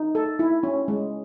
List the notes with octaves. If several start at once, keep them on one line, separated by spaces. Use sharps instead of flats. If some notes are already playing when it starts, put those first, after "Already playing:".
Already playing: D#4
A4
E4
C#4
G#3